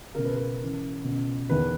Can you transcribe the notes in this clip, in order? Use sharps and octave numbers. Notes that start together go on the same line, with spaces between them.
C#2 B2 A#4
B4
A#4
C#2 C#3 E3
C#2 B2
E2 D#3 B4